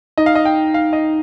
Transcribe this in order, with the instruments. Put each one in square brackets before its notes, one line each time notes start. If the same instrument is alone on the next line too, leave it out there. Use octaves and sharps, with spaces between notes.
[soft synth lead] D#4 [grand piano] D#5
[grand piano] F5
D#5
G5
F5
D#5